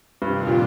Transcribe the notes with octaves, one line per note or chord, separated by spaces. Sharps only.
G2 C3 D#3 G3 D4 F4
A#2